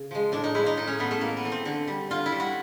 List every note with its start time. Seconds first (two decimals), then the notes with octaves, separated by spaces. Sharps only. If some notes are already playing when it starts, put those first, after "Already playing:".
Already playing: C#3
0.11 F3 G#3
0.32 A2 D4
0.44 D#4
0.54 F3 G#3 E4
0.66 D#4
0.77 A2 D#4
0.87 C#4
0.99 E3 A3 B3
1.11 A3
1.21 A2 A#3
1.37 B3
1.44 E3 A3
1.52 C4
1.65 D3
1.88 G3
2.10 D3 F4
2.26 E4
2.32 G3
2.40 F#4